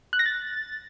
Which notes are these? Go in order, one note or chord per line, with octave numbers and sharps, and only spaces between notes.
F#6
A#6
A6